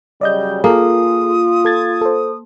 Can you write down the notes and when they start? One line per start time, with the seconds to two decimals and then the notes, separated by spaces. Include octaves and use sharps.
0.21 C#3 F#3 G3 D5 D#5 G6
0.64 A#3 F4 G#4 A4 D#6
1.65 A4 G#6 A6
2.01 A4 C5